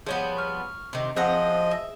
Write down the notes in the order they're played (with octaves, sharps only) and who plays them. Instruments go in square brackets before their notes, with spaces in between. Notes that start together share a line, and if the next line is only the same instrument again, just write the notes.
[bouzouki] F3 G3 B3 [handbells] G#4 C#5
[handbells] C#6 F6
[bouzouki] C3 D#3
[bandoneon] F3 D#5 [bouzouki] C4 F#5 A#5 [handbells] G#4
[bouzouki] E5